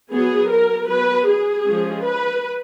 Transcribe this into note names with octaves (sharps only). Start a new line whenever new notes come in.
F#3 B3 G#4
A#4
F#3 B3 B4
G#4
F3 G#3 C#4
B4